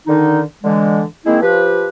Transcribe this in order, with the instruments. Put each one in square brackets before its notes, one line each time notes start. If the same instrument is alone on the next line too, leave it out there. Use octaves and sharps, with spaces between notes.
[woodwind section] D3 D#3 D#4
D3 E3 G#3
D#3 G#3 A#3 C4 E4
F3 G4 B4